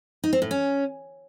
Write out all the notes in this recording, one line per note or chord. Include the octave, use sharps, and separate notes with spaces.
D#4
C4
A2
C#4